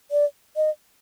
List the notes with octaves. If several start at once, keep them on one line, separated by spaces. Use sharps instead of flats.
D5
D#5